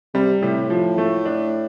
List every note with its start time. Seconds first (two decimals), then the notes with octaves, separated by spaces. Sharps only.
0.14 C3 G3
0.42 A2 C3
0.70 F3
0.98 A3
1.25 D4